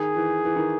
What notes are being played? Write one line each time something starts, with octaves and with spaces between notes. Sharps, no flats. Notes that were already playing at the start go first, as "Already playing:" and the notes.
Already playing: D#3 G#4
E3
E3
D#3